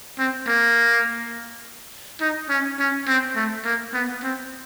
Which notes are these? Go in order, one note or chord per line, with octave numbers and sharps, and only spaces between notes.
C4
A#3
D#4
C#4
C#4
C4
A3
A#3
B3
C4